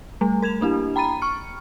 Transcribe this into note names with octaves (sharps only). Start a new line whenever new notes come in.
G3 A3
A#4 G#6 E7 F7
A#3 D4 E4 G4
G5 A#5 B5 A6 D#7
C#6 F6 C#7